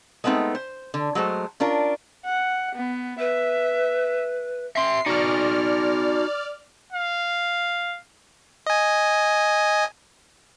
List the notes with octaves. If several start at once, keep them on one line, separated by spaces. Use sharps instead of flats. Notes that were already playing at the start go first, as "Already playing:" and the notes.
G#3 A3 B3 C4 D#4
C5
D3
F#3 G#3 A3 C5
C#4 D4 F4 A#4
F#5
B3
B4 E5
E5 C6 C7
D#4 F#4 D5 F6
F5
D#5 G#5